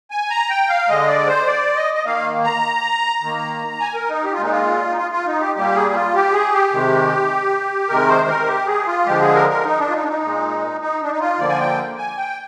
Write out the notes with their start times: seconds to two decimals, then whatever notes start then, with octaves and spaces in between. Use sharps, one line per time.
0.11 G#5
0.30 A#5
0.50 G5
0.69 F5
0.88 D3 G#3 D#5
1.08 D5
1.27 C5
1.47 D5
1.76 D#5
1.94 D#5
2.05 D#3 A#3 F5
2.44 A#5
3.22 D#3 A#3
3.80 G#5
3.95 A#4
4.10 D#4
4.24 G4
4.33 F4
4.39 A#2 G#3 D#4
4.51 F4
4.91 D#4
4.97 F4
5.11 F4
5.26 D#4
5.41 G4
5.55 A#2 G3 A#3 G4
5.75 G#4
5.94 F4
6.14 G4
6.33 G#4
6.53 G4
6.73 C3 D#3 G#3
7.89 C3 D#3 G#3 A#4
8.09 C5
8.28 A#4
8.47 G4
8.67 G#4
8.87 F4
9.06 D3 F3 G#3 G4
9.21 G#4
9.35 A#4
9.49 A#4
9.64 D#4
9.79 D4
9.89 F4
9.93 D#4
10.03 D4
10.08 D#4
10.22 A#2 G#3
10.81 D#4
11.02 D4
11.11 D#4
11.20 F4
11.39 D3 F3 A#3 D5
11.49 G#5
11.59 G5
11.98 G#5
12.17 G5